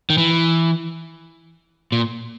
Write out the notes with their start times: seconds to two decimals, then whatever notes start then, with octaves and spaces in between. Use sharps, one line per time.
0.10 D#3
0.18 E3
1.92 A#2